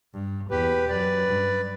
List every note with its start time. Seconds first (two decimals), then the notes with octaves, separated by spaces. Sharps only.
0.13 G2
0.50 E2 G4 B4
0.88 F#2 B4 D5
1.27 G2